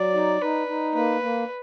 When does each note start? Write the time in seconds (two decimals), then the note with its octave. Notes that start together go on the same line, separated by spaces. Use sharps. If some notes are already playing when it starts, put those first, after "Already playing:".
Already playing: F#3 D5
0.14 D#4
0.41 D#4 B4
0.67 D#4
0.94 A#3 B4
1.22 A#3